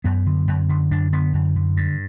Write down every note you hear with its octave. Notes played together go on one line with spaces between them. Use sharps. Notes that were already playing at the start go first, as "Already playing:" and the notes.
F#2 B3
D3
F#2
D3
F#2 D4
D3 B3
F#2
D3
G2